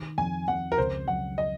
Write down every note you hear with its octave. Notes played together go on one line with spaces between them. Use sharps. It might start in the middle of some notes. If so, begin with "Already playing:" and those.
Already playing: D#3
F2 G#5
F2 F#5
A#4
C#2 C5
F#3 F#5
D#5